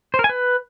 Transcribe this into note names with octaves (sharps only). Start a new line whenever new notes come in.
C5
A#4
G#5
B4